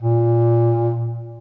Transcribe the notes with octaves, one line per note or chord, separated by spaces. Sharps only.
A#2